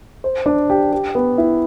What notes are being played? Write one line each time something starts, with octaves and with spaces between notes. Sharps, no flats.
C5
D4
G4
G4
B3
E4